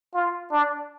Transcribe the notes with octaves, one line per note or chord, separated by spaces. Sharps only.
F4
D4